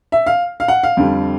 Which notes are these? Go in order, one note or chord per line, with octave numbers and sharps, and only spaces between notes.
E5
F5
F5
F#5
F5
F2 D3 G3